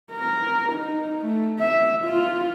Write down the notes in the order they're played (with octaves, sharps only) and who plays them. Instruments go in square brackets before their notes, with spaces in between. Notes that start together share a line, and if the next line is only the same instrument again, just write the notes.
[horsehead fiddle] A#4
D#4
A3
E5
F4